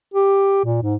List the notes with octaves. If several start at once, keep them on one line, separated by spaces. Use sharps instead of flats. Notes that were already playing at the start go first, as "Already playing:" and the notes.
G4
A#2
G#2